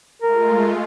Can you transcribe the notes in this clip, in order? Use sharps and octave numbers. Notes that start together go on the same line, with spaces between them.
G#3 A3 F4 A#4